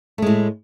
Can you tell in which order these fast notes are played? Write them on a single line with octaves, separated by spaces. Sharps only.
A3 G#3 A2